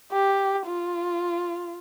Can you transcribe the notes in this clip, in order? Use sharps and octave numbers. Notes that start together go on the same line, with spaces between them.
G4
F4